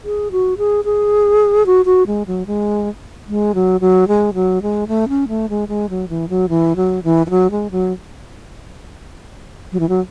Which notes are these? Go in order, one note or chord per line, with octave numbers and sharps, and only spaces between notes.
G#4
F#4
G#4
G#4
F#4
F#4
G#3
F#3
G#3
G#3
F#3
F#3
G#3
F#3
G#3
A3
C#4
A3
G#3
G#3
F#3
E3
F#3
E3
F#3
E3
E3
F#3
G#3
F#3
F#3
E3
F#3